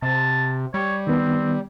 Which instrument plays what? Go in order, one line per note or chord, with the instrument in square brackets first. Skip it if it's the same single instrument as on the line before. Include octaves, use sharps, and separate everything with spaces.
[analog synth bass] C3 [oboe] A5
[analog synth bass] G3 [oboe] C#5
[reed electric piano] D#3 B3 [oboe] C4